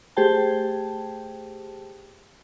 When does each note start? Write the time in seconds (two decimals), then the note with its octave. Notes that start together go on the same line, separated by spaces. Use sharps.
0.17 A3 G4 G#4 C5 G5 A5